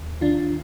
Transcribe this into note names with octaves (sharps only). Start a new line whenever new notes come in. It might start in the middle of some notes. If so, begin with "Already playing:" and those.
Already playing: D#2
D#3 D4 F4